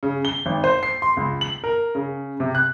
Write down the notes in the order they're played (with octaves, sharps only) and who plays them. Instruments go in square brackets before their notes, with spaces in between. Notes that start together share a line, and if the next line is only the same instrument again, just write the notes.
[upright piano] C#3
G7
G#1
C5
C7
C6
C#2
F#7
A#4
C#3
C3
F#6